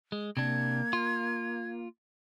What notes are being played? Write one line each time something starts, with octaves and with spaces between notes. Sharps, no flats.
G#3
C3 A#3 D4 G#6
F4